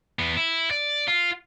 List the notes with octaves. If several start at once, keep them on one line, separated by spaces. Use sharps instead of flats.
E2 B3
E4
D5
F4